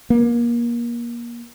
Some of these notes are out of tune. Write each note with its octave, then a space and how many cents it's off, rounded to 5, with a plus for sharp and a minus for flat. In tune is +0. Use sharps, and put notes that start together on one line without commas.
A#3 +30